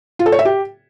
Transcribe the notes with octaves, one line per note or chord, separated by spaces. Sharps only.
F4
A4
C#5
E5
G4